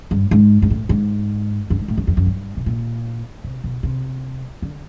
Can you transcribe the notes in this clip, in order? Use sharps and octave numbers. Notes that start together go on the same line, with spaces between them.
G2
G#2
G#2
A2
G#2
G2
G#2
A2
F#2
F2
F#2
G2
B2
A#2
C3
B2
C3
D3